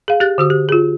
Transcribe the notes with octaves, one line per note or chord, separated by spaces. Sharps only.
G#4 F5
G4 F#6 A6
D3 F#4 D#6
G4
F4 G#4